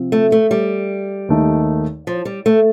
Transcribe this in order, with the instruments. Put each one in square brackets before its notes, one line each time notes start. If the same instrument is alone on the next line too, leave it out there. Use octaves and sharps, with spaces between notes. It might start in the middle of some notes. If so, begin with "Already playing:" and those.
Already playing: [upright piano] C3 F3 C4
[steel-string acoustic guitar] A3
A3
G3
[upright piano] D#2 D#3 A3 D#4
[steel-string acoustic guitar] F3
G3
A3